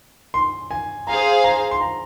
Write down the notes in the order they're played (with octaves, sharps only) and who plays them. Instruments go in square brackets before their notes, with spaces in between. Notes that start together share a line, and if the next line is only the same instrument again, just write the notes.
[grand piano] C6
G#5
[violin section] G#4 C5 F5 [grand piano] A#5
[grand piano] A#5
C6
A#5